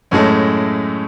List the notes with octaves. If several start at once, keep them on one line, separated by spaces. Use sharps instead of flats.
F#2 A2 G#3 A3